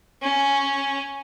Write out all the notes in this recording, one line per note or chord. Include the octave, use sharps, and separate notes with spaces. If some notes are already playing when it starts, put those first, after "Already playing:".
C#4